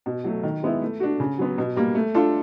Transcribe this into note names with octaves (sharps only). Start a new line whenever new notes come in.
B2
F#3 A3
D#3
G#3 B3 E4
A3
D4 F#4
C#3
F#3 B3
B2
G3 A#3
A3
D4 F4 A4